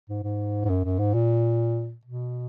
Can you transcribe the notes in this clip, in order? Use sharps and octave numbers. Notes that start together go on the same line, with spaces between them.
G#2
G#2
G#2
F#2
F#2
G#2
A#2
B2